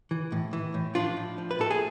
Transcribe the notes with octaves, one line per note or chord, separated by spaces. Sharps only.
E3
A2
E3
A2
F3 D4 F4
A2
F3
B4
A2 A4
G#4